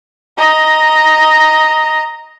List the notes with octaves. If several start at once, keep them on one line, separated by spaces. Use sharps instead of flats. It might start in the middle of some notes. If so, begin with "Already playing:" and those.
D#5 A#5